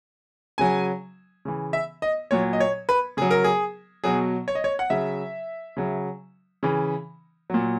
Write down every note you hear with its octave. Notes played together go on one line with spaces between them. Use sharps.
C#3 F#3 G#5
C#3 E3
E5
D#5
A#2 F#3 C#5
D#5
C#5
B4
C#3 F#3 G#4
A#4
G#4
B2 F#3 G#4
C#5
D#5
C#5
F#5
C#3 F#3 E5
C#3 F#3
C#3 E3
A#2 F#3